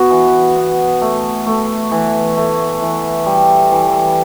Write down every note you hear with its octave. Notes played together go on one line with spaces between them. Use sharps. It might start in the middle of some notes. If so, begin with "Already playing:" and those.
Already playing: B3 F#4
E3
B3
A3
A3
E3
A3
E3
G3
E3